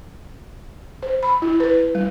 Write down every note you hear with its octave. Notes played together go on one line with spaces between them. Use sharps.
C5
B5
E4
B4
G3